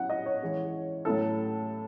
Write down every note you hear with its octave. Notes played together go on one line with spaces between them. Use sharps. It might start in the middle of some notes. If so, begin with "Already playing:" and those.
Already playing: F#3 C#4 E4 F#5
D#5
C#5
E3 G#3 C#4
A2 F#3 C#4 E4 A4